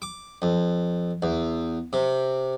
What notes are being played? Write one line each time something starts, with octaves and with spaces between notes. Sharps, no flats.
D6
F2
E2
C3